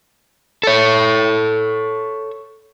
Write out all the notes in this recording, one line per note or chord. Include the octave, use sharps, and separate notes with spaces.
A4 C#5